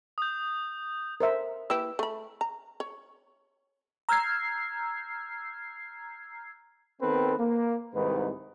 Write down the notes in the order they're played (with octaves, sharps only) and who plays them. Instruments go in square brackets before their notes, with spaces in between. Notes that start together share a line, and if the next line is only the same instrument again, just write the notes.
[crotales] D#6 G6
[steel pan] A#4 C5 E5
[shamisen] A#3 E4 G4 [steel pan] B4 E6
[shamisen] A3 B5
A#5
C#5
[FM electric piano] A#5 E6 F6 G6 G#6 C7
[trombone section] D#3 B3 C4 A4 B4
A#3
C2 G#2 D#3 B4